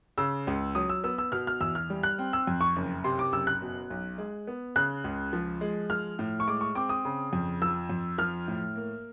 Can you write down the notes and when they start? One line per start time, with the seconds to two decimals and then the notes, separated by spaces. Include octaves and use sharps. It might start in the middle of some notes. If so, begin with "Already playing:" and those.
0.18 C#3 E6
0.47 C#2
0.75 F#3 D#6
0.89 E6
1.04 B3 E6
1.18 E6
1.32 B2 F6
1.47 F6
1.61 E2 E6
1.75 F6
1.90 G3
2.03 F#6
2.19 C4
2.33 E6
2.47 F2
2.61 C#6
2.76 F#1
3.04 C3 C6
3.19 D6
3.32 F#1 E6
3.47 F#6
3.62 B2
3.90 B1
4.18 G#3
4.47 B3
4.76 C#3 F#6
5.04 C#2
5.33 F3
5.61 G#3
5.90 F3 F6
6.19 A2
6.40 C#6
6.47 G#3 D6
6.61 C#6
6.75 C4 D6
6.89 D#6
7.05 C#3
7.33 F2
7.62 F3 E6
7.90 F2
8.18 F3 F6
8.48 A2
8.76 A#3